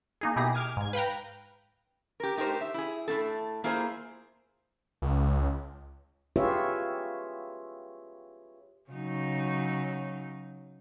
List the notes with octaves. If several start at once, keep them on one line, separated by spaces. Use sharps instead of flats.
A#3 D#4 G#4
B2 E4 G4 G#4 A#6 C7
D6 F6 G#6 D#7
G#2 G#6
B4 F5 G5 A#5
G4 A#4
A3 D#4 G4 A#4 C5
E5
E4 G#4
A2 A3 C4 A4
A#3 E4 F4 G#4 C5
C#2
F4 G4 G#4 B4 C#5 E5
C#3 F#3 D#4